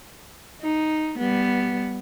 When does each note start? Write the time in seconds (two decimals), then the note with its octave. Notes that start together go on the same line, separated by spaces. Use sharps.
0.61 D#4
1.18 G3 B3